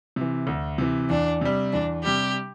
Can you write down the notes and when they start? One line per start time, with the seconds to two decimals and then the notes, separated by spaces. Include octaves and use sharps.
0.16 C3 E3
0.47 D2
0.78 C3 E3
1.10 E2 D4
1.41 C3 G3
1.73 E2 D4
2.04 C3 G3 G4